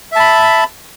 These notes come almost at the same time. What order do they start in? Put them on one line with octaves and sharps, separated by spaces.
E5 A5 B5